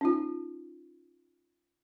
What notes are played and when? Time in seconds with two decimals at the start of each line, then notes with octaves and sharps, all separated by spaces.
0.01 C#4 D#4 F4